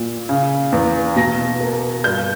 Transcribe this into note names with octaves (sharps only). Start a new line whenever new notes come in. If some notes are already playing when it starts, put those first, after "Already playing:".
Already playing: A#2
C#3
E2
B2 A#6
A#3
G2 G6